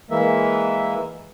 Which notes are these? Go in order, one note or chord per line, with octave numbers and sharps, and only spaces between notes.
E3 G#3 A#3 E5